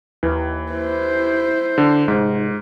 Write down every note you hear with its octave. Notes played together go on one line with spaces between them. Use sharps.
D#2 E3
E4 C5
D3
F1 G#2